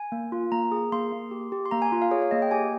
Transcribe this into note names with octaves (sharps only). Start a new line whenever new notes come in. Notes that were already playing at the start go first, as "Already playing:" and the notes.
Already playing: G#5
A#3
F4
A#3 A#5
G#4
A#3 C6
A#3
G4
G4
C6
A#3 A#5
G#5
F4
F5
G#4 C#5
C#5
A#3 D#5
G5
G4 G#5